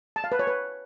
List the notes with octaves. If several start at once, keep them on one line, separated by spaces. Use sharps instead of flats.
A5
F5
B4
C#5
B4